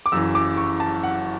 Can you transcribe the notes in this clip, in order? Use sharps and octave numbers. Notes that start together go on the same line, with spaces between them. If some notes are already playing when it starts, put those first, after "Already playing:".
D6
F#1 F#2 E3 E6
D6
C#6
A5
F#5